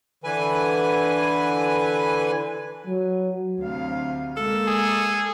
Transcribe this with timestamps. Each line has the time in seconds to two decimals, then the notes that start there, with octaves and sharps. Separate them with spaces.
0.24 D3 E3 B4 G#5
2.87 F#3
3.60 D2 C3 F5
4.37 G#3 A#3 A4
4.67 G#4